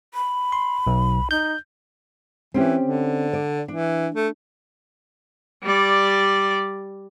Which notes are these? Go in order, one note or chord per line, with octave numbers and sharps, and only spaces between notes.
B5
C6
B1
D#4 G6
E3 C4 C#4 G4
D3
D5
E3 D4
A3
G3 D5